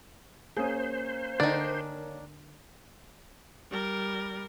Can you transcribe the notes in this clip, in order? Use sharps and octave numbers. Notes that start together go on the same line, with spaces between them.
A#3 C#4 G#4 C5
D3 D#3 D4 A#4
G3 A#4